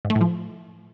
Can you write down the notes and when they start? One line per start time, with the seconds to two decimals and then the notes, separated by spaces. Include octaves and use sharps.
0.05 G#2
0.10 A3
0.15 A2
0.21 F3